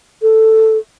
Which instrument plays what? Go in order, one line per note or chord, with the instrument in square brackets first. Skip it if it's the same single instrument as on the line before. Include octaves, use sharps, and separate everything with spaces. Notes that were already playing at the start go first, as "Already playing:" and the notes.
[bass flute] A4